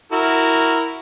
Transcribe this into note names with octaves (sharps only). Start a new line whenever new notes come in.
E4 F#4 A#4